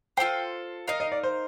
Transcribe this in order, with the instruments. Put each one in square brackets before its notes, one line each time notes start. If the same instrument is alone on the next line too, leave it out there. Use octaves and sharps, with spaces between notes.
[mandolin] F4 A4 C5 [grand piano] G5
[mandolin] D#4 A#4 F5 [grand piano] D#5
[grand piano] D#5
D5
C5